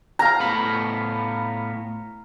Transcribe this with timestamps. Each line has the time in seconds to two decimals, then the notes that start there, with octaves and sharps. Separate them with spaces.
0.19 F5 A#5
0.40 A2 B3 B5